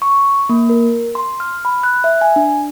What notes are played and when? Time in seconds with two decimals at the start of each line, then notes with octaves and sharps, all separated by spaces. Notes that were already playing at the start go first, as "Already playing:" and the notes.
0.02 C#6
0.49 A#3
0.69 A#4
1.15 C6
1.40 F6
1.65 B5
1.83 F#6
2.04 E5
2.21 G#5
2.36 D4